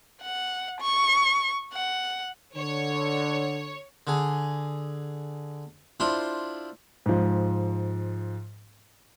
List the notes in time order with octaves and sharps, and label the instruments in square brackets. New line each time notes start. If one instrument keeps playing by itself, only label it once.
[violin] F#5
C#6
F#5
[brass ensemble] D3 [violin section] C#5
[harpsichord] D3 G#4
D4 E4 F4 C5
[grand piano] G#2 F3